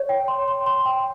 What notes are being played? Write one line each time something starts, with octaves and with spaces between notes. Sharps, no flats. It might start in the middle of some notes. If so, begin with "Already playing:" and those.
Already playing: C#5
G5
C6
C6
C6
G5